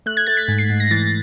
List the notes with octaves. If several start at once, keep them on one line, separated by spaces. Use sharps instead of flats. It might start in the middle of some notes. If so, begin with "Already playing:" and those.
A3 F#6
G#6
A3 A6
B6
G#2
C7
G#2
A#6
E3 A6